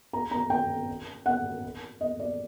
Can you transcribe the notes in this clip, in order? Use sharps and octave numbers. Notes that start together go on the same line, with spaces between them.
A#5
A#5
G5
F#5
D#5
D5